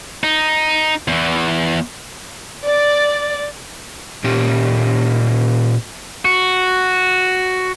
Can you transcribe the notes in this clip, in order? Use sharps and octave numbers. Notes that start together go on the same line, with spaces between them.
D#4
E2 E3
D5
A#2 C#4 G4
F#4